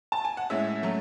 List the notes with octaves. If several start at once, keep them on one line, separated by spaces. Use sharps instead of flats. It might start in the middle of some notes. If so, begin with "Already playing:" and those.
A5
G#5
F#5
A2 G#3 C#4 E5
F#3 A3 C#4